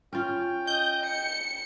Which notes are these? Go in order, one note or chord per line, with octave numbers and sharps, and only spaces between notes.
C#4 F4 G5
D#5 G6
C#7